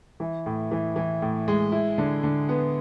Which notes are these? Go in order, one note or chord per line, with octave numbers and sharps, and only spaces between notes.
E3
A2
E3
E3
A2
G#3
E4
D3
D3
B3